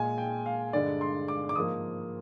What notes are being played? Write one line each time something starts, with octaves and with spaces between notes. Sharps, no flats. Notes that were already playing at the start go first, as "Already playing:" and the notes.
Already playing: A#2 G#3 G#5
G5
F5
G2 D3 G#3 D5
C6
D6
D6
G#2 F3 A#3 D#6